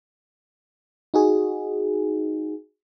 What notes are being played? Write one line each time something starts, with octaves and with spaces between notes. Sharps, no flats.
D#4 F#4 G#4